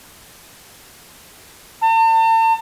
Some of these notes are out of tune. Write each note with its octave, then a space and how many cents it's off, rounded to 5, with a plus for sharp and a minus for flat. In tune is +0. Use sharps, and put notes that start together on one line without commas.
A5 +40